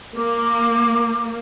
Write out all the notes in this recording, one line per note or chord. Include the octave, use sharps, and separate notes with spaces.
A#3 D6